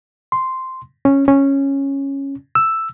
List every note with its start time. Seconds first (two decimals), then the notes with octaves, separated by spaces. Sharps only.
0.32 C6
1.05 C#4
1.28 C#4
2.55 E6